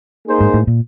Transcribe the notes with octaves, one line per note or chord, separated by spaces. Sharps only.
A#3 D#4 G#4 C5
G#2
A2
A#2